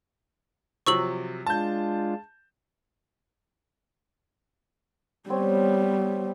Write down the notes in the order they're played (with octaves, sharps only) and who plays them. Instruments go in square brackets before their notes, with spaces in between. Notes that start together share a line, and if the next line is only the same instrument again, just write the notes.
[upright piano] C3 F3 F#3 [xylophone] C#6 E6 F#7
[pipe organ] G#3 D4 F4 [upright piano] A5 G6
[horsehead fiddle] G3 B3 [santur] C4 C#5